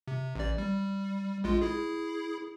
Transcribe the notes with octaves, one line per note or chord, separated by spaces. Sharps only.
C3
A1 D5
G3
A#1 G#3 F4
E4 G#4